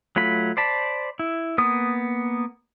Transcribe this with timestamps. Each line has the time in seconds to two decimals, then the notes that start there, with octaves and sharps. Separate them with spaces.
0.16 F#3 A3 F4 B5
0.57 C5 D5 A5 B5
1.19 E4
1.58 A#3 B3 D#6